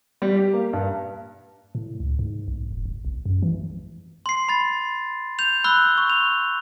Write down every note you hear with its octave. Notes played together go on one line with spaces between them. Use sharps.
G3
G4
A#3
G2
A2
C#2
G#2
B1
E1
F#1
B1
F#2
E3
C6 C7
B5 A6
G6 F7
B5 E6 F#6 G7
C#6
F7